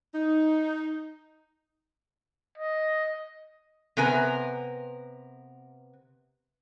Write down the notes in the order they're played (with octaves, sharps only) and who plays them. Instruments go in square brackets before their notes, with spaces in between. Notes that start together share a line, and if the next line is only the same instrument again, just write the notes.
[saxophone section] D#4
[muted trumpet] D#5
[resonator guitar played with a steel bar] C3 B3 A#4 G#5